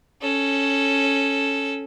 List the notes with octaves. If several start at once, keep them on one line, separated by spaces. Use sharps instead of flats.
C#4 A4